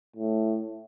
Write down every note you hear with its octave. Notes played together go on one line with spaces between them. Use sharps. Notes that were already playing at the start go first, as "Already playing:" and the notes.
A2